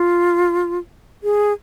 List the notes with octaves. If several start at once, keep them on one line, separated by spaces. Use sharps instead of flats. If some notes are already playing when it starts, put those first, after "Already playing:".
Already playing: F4
G#4